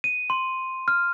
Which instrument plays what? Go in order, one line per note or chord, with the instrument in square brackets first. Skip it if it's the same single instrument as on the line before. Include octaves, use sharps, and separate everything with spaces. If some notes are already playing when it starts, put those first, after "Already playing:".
[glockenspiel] D#7
C6
F6